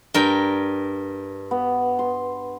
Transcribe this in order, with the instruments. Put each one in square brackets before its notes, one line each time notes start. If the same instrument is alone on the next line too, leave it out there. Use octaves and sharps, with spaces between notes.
[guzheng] G2 A#4 G5
[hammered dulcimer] B3
C6